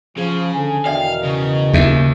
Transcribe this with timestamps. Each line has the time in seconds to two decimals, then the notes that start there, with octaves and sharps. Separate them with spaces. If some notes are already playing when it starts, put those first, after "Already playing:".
0.17 C#3 F3 G#4
0.55 D3 A4 G#5
0.86 E2 B2 D#3 D5 E5 F5 G5
1.24 C#3
1.73 D#2 D#4 E5